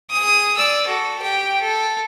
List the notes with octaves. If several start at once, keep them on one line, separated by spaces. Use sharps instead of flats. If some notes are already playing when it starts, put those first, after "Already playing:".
G#4 D#6
D5 E6
F#4 A4
G4 G5
A4